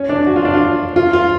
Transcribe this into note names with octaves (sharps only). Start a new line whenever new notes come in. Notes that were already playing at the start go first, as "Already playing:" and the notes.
Already playing: C#4
D4
F#4
F4
D4
F4
F4
F4